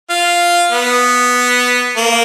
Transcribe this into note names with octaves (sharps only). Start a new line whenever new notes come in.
F4
B3
A#3